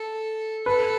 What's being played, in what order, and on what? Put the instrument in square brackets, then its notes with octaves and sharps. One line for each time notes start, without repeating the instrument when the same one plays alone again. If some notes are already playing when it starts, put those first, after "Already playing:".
Already playing: [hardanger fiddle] A4
[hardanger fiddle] A4 [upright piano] B4